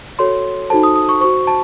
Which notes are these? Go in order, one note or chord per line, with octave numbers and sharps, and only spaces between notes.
F#4 A4 C#5 C6
D#4 F#4 A4 C5 A5
D#6
D#6
C#6
F#4 C5 C#6
A5